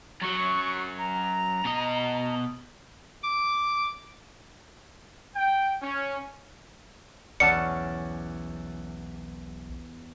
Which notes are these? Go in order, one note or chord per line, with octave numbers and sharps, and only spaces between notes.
F#2 F#3 C#6
A#5
B2 D#5
D6
G5
C#4
B1 E2 C#4 D5 F#5 A5 C#7